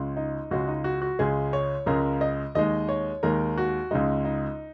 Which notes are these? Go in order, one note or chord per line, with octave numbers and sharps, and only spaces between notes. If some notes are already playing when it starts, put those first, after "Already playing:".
Already playing: C#2 C#3 G#3
D#4
C#2 C#3 G#3 F#4
D#4
F#4
F#4
C#2 C#3 G#3 G#4
C#5
C#2 C#3 G#3 A#4
D#5
D#2 D#3 G#3 D#5
C#5
D#2 D#3 G#3 A#4
F#4
C#2 C#3 G#3 D#4
D#4